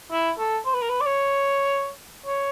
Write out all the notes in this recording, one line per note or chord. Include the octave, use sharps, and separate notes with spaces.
E4
A4
C5
B4
A#4
B4
D5
C#5
C#5